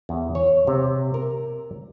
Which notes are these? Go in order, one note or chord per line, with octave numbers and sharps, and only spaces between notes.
E2
C#5
C3
A#4